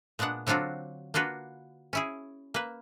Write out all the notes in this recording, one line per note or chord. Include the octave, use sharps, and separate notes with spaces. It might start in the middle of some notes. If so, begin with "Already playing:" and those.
A#2 G#3 B3 D4 F#5
D3 F#3 C4 D4 F4 F#4
A#3 D4 F4 F#4 B4
C#4 E4 G#4
A#3 B4